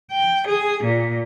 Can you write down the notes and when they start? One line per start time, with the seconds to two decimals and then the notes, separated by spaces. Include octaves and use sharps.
0.12 G5
0.47 G#4
0.84 A#2